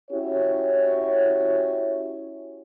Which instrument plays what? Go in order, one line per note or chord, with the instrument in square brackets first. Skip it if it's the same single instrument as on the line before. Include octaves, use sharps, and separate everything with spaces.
[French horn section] C#4 E4 F#4 G4 C#5